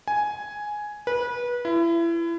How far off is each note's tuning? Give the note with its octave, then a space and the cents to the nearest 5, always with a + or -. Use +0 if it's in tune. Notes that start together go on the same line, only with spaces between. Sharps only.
G#5 +5
B4 -25
E4 +30